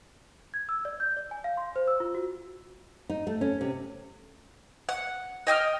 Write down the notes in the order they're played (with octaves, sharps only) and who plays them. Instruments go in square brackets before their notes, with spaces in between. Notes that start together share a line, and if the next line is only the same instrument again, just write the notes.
[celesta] G#6
E6
D5
G6
D5
G#5
F5
C6
C5
E6
F4
F#4
[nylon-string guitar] D#4
A3
C#4
C3
[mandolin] F#5
D#5 G5 D#6 F6